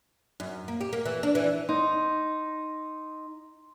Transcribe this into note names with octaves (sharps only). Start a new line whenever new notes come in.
F#2
A#3
G4
A#3
E3
D4
E3
D#4 C6